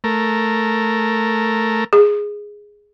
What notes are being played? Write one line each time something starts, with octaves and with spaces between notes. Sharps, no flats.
A3 A#4
G#4